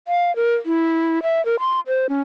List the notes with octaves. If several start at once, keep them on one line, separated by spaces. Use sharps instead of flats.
F5
A#4
E4
E5
A#4
C6
C5
C#4